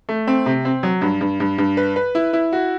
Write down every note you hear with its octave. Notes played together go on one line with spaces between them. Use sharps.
A3
C4
C3
C4
F#3
G2
G2
G2
G2
B4
B4
E4
E4
F#4